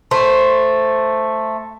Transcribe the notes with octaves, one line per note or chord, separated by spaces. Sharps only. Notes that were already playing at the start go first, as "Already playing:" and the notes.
A3 C5